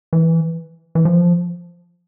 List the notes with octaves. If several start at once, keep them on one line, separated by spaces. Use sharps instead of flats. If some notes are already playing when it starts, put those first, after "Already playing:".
E3
E3
F3